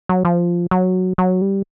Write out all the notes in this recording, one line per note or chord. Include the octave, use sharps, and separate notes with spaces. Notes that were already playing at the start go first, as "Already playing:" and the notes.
F#3
F3
F#3
F#3
G3